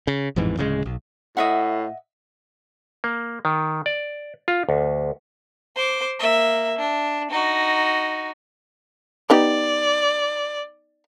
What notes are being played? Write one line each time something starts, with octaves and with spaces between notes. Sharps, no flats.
C#3
A1 F2 G#2 E3
D1 C#3 E3 G#3
B1
A2 D#5 E5 F#5
A#3
D#3
D5
F4
D2
C5 D6
A#3 E5
D4
D#4 F#4
B3 D#4 G4 D5